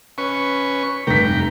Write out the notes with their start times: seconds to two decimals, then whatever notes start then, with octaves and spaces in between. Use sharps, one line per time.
0.18 C#4 B4 C#6
1.07 F1 G2 G5 A#5 B6